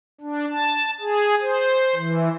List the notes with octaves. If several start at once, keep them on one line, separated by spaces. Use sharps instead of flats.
D4
A5
G#4
C5
E3